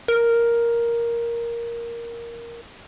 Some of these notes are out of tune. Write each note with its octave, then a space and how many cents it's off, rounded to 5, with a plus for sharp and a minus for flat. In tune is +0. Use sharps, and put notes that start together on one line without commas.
A#4 +5